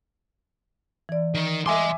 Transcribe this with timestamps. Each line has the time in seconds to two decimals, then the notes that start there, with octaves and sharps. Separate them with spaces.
1.09 E3 D5
1.35 D#3
1.66 D#5 E5 G#5 C6 D6